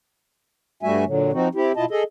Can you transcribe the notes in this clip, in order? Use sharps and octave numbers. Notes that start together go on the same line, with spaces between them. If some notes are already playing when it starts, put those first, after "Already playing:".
G2 G3 A3 F#4 E5 G#5
A#2 D3 F#3
F3 C4 D#4 F#4
C4 E4 G4
B2 E4 F4 D#5 A5
G#4 A4 D#5